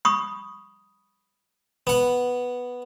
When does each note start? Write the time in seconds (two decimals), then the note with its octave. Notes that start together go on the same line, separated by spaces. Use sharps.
0.05 B5 C#6 D#6
1.87 B3 F#5